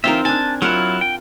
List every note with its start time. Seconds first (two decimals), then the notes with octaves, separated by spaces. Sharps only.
0.04 E3 C4 D#4 F4 A#4 E5
0.25 D4 G#5 A5
0.62 F#3 E4 F4 A#4 F#5
1.01 G5